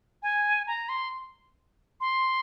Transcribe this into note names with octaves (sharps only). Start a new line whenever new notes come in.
G#5
A#5
C6
C6